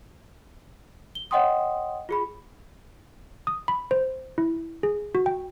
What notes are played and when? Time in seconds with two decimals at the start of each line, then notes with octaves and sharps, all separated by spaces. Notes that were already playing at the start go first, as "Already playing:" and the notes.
1.15 G7
1.31 C#5 D#5 F#5 G5 C6 D#6
2.09 F4 G#4 B5
3.47 D#6
3.68 B5
3.91 C5
4.38 E4
4.83 G#4
5.15 F#4
5.26 G5